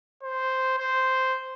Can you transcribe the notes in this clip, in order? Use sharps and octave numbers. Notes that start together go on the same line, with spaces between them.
C5
C5